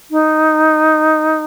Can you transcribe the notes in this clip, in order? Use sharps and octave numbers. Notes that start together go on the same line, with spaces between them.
D#4